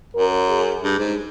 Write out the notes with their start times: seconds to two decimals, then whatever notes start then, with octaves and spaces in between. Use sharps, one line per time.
0.13 F#2 A#4
0.49 G#4
0.82 G2
0.99 G#2